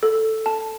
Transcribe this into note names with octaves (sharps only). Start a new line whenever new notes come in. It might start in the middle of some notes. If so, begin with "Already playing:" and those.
A4
A5